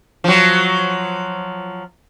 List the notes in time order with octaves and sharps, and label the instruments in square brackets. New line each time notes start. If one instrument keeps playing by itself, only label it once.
[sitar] F3 F#3